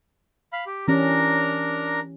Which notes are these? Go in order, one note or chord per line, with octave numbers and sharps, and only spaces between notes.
F5 B5
G4
E3 C#4 D4 G4 A#4 A#5